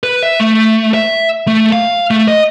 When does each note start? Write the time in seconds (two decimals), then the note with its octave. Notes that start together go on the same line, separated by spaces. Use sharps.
0.03 B4
0.23 E5
0.40 A3
0.94 E5
1.47 A3
1.73 F5
2.11 A3
2.28 D#5